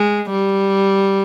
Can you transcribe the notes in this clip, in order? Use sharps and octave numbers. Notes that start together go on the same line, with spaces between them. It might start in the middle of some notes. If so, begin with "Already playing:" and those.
Already playing: G#3
G3